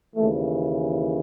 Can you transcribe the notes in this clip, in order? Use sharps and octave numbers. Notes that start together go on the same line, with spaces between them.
D#2 C#3 E3 A3